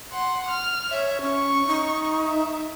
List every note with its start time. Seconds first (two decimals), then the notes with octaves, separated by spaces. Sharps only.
0.12 F#5 C6
0.49 F6
0.91 C#5 E5
1.21 C#4 C#6
1.67 D#4
2.24 E5